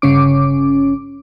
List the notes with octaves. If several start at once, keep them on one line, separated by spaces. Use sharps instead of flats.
G1 C#3 C#4 D6